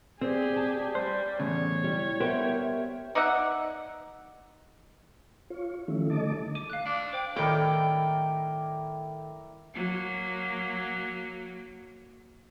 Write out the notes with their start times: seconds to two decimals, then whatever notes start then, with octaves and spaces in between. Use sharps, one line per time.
0.21 C4 G4 G#4 C5 D5
0.56 A5
0.95 G3 C5
1.40 E2 A2 C#3 C#5
1.84 G3 E4
2.20 B3 G4 A#4 C5 E5
3.15 D#4 D5 E5 F#5
5.50 F4 C#5
5.88 D#3 F3 G3 A3 C#4 E4
6.10 D3 A3 D#5 A5 D6
6.55 D6 D#7
6.70 F5 F#6
6.86 D4 F5
7.13 C5 G5 D6
7.36 A2 D#3 E4 A#4 D5 G5
9.74 F#3 A#3